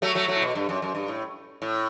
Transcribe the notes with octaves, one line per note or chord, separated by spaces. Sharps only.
F#3 A3
F#3 A3
F#3 A3
A2
B2
G2
F#2
F#2
G2
A2
A2